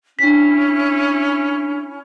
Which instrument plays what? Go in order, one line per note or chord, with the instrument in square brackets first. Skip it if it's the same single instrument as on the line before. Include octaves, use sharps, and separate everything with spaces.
[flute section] C#4 E4 [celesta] D4 B6